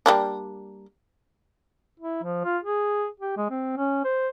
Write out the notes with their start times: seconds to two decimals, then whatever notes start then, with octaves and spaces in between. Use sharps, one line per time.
0.06 G3 A#3 D4
2.00 E4
2.24 F3
2.45 F4
2.63 G#4
3.20 G4
3.37 G#3
3.50 C4
3.77 C#4
4.04 C5